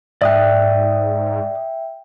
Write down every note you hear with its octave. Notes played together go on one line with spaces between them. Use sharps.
G#2 D5 E5 G5 D#6 F#6